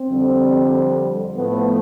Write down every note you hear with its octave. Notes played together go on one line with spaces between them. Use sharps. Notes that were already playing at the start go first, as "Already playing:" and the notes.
Already playing: C4
F2 D3 G3
A2 F3 A3 B3